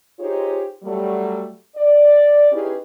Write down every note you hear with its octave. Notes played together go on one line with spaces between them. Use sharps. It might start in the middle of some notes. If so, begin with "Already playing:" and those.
D#4 F4 G4 G#4 C5 C#5
F#3 G3 A3
D5
C#4 D#4 E4 G4 G#4 B4